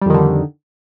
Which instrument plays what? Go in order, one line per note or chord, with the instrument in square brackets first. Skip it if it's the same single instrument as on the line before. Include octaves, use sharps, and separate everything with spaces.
[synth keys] G3
F2
D#3
D3